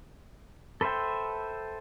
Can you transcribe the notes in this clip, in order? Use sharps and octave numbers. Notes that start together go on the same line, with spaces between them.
A4 B4 C5 E5 G5